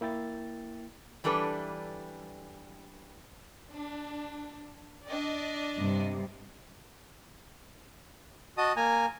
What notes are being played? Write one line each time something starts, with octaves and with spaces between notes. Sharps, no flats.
A#3 E4 G5 A6
E3 G3 D4 A4 B4
D4
D4 D5 D#5
G2 C3
F#4 D#5 A5 D#6
A#3 G#5 A#5